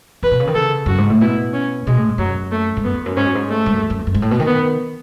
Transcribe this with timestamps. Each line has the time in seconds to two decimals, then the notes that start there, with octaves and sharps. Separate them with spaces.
0.23 E2 B4
0.31 B2
0.40 C#3
0.47 D#3
0.55 C#3 A4
0.86 F#2 F#4
0.98 G#2
1.10 A2
1.21 B2 E4
1.53 C#4
1.86 B2 G#3
1.97 A2
2.08 G#2
2.18 F#2 F#3
2.52 A3
2.77 G#2
2.84 F#2 B3
2.94 E2
3.06 F#2
3.17 G#2 C#4
3.26 F#2
3.35 G#2
3.50 A3
3.66 G#2
3.73 F#2
3.82 E2
3.90 F#2
3.98 E2
4.07 F#2
4.14 G#2
4.22 A2
4.31 B2
4.39 D#3
4.47 B3